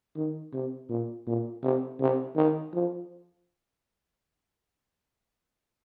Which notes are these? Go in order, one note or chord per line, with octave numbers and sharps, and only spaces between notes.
D#3
C3
A#2
A#2
C3
C3
D#3
F3